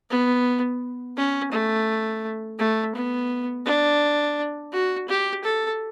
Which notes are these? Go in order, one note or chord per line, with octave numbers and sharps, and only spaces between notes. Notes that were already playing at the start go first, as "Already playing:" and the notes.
B3
C#4
A3
A3
B3
D4
F#4
G4
A4